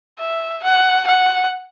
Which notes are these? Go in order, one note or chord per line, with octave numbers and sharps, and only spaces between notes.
E5
F#5
F#5